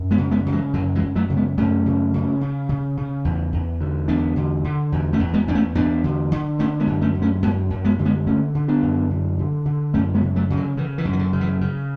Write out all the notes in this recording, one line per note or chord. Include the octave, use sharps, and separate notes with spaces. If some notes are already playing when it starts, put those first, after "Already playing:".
Already playing: F#2
G#3 B3
C#3
G#3 B3
C#3
E3 G#3
F#2 D3 F#3
E3 G#3
F#2
F#3 A3
C#3
G#3 B3
F#2 A3 C#4
C#3
C#3
C#3
C#3
C#3
E2
E2
D3
E2 B3 D4
D3
D3
E2
A3 C#4
E2
G#3 B3
E2 D4
A3 C#4
E2 B3 D4
D3
D3
D3 A3 C#4
G#3 B3
F#2
A3 C#4
D3
A3 C#4
F#2 G#3 B3
F#2
G#3 B3
D3
G#3 B3
D3 A3 C#4
D3
B3 D4
F#2
D3
D3
D3
F#2 A3 C#4
G#3 B3
C#3
F#3 A3
C#3
D3 F#3
C#3 E3
E3
F#2
E3
D3
C#3
E3
C#3